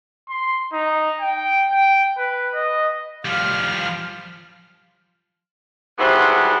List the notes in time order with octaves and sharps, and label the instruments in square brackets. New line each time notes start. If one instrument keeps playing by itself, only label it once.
[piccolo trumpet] C6
D#4
G5
G5
B4
D#5
[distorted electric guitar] F3 G3 [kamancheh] F5 F6
[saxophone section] G#2 G3 B3 E4 F#4 C5